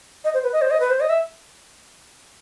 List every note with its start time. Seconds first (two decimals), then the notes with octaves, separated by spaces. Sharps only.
0.24 D#5
0.34 C5
0.43 B4
0.53 D#5
0.61 C5
0.70 D#5
0.80 B4
0.90 C5
1.00 D#5
1.09 E5